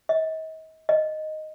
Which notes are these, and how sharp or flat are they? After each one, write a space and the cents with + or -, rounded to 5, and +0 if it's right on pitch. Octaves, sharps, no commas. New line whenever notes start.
D#5 +40
D#5 -5